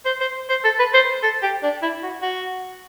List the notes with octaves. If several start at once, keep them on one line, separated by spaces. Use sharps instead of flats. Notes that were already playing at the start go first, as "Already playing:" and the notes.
C5
C5
C5
A4
B4
C5
A4
G4
D4
E4
F#4
F#4